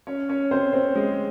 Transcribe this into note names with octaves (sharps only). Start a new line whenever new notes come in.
C#4 C#5
C#4 C#5
C4 C5
C4 C5
G#3 G#4